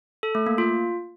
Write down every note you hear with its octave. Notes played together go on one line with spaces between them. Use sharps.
A4
A3
A#3
F4